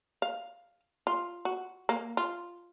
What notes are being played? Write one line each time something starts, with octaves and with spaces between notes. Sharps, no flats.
F5
F4
F#4
A#3
F4